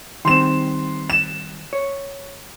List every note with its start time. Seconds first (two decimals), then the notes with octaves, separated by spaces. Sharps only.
0.25 D#3 G3 C4 C6 E7
1.10 E7
1.73 C#5